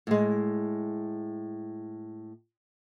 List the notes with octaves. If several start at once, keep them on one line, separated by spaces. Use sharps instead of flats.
A2 G#3